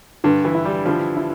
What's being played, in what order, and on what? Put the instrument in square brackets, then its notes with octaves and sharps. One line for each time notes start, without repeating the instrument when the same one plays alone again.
[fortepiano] G2 [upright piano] D3
[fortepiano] E3
[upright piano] E4
[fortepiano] G3
[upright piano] D3 [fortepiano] F3
[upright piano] E4